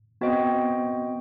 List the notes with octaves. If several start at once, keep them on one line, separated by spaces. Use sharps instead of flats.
B3 C4 F#4 C5 D#5 G5